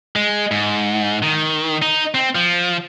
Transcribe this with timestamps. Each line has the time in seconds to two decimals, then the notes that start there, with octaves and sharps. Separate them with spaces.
0.16 G#3
0.51 G#2
1.23 D#3
1.82 D#4
2.15 C4
2.35 F3